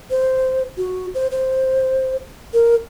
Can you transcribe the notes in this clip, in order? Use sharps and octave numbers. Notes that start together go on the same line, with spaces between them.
C5
F#4
C5
C5
A#4